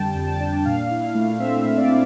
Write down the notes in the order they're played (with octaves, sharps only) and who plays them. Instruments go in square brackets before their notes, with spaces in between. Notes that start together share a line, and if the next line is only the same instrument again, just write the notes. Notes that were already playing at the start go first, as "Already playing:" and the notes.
Already playing: [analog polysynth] F2 D3 G3 G5 A5
F2
A5
D4
A#2 F5
E4
F5
A3
C4 E5
A#2
D5
E4